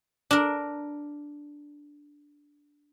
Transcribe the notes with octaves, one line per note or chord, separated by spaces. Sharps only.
D4 A#4